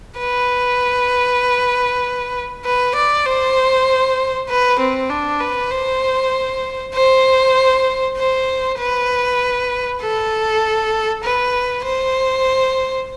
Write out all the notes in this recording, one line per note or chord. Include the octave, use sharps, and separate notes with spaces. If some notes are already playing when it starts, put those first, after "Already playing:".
B4
B4
D5
C5
B4
C4
D4
B4
C5
C5
C5
B4
A4
B4
C5